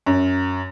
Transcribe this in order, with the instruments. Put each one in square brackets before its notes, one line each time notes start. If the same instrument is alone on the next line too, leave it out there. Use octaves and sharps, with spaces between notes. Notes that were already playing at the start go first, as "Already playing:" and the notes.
[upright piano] F#2